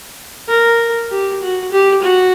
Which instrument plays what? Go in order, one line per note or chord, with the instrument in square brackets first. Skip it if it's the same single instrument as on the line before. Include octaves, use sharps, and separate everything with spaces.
[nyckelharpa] A#4
G4
F#4
G4
F#4